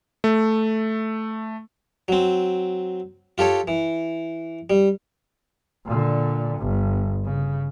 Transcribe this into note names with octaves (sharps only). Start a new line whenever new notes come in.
A3
F#3 C4
F4 G4 A4 C#5
E3
G3
A#2 D3
G1
C#3